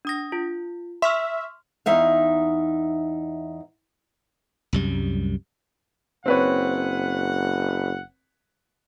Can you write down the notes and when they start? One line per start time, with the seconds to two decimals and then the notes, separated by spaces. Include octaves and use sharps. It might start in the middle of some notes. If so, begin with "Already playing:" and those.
0.05 D4 D#6 A#6
0.32 F4
1.02 E5 C6 C#6 F6
1.86 E2 D#4 E5 F5
4.73 C2 F#2 G3
6.26 F#1 C4 B4 C#5 F#5